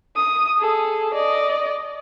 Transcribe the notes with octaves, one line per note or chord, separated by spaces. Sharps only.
D#6
G#4 A4
D5 D#5